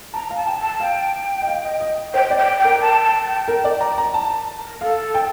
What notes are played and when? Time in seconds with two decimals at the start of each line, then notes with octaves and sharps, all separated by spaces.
0.14 A5 A#5
0.30 F5
0.35 A5
0.47 G5
0.59 A5
0.80 F5 G5
1.42 D#5
1.47 F5
1.64 D#5
1.80 D#5
2.14 C5 G5
2.30 D5
2.36 G5
2.58 G5
2.64 A#4
2.81 A5
3.03 A5
3.25 G5
3.48 A#4
3.64 D5
3.81 A#5
3.98 A#5
4.14 A5
4.58 A#4
4.81 A4 F5
5.14 G5